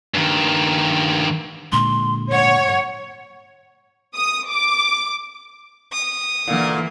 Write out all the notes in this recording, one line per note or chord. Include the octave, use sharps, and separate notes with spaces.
G2 D#3
A#2 D3 G#3 C6
C#5 F#5
D#6
D6
D#6
A#2 D3 E3 A#3